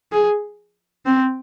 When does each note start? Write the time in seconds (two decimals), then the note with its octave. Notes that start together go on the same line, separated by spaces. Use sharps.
0.12 G#4
1.06 C4